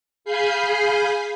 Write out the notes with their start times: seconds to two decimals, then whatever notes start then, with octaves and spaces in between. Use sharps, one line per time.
0.25 G#4 F5 G#5 B5 G6 C7